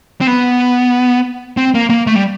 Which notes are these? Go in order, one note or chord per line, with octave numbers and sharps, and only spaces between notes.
C4
B3
C4
A#3
A#3
A3
G3